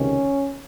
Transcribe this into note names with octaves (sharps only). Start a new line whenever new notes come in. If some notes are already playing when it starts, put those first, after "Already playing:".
Already playing: C#2 C3 D#3 C#4